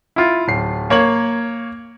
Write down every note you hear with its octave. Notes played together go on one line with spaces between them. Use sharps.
E4 F4
D1 C7
A#3 C#5 G#6 F#7